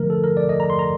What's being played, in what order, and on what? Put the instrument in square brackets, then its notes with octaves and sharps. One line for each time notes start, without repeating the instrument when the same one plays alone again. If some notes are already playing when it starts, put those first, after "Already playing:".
Already playing: [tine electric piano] D3 F3 A3 A#4
A4
A#4
D5
D#5
A#5
C6
A#5